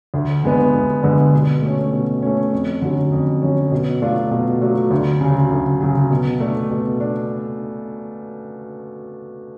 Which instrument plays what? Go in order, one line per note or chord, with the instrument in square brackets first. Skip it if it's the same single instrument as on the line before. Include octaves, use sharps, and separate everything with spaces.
[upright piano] D2
D3 G#3 B3 D4
D2
D3 G#3 B3 D4
B2
A3 C#4
B2
A3 C#4
F2
D3 F#3 C#4
F2
D3 F#3 C#4
B2
F#3 A3 D4 F4
B2
F#3 A3 D4 F4
D2
C#3 F#3
D2
C#3 F#3
B2
A3 D4
B2
D4